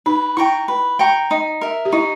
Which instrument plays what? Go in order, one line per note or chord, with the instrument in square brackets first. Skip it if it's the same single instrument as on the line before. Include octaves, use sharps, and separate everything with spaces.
[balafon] D#4 [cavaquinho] B4
[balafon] E4 [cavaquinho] G5 A#5 C#6
[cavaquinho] B4
G5 A#5 C#6
D#4
A#4 E5
[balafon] G4
[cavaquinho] D#4 [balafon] E4